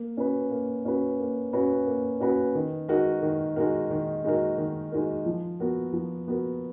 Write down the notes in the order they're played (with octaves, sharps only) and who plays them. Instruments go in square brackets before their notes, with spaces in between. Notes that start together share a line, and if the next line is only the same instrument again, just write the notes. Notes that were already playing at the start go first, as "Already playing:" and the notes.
Already playing: [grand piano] A#3
C#4 F#4 B4
A#3
C#4 F#4 B4
A#3
C#4 F#4 B4
A#3
C#4 F#4 B4
D#3
G#3 D#4 F#4 A#4
D#3
G#3 D#4 F#4 A#4
D#3
G#3 D#4 F#4 A#4
D#3
G#3 D#4 F#4 A#4
F3
B3 F#4 A#4
F3
B3 F#4 A#4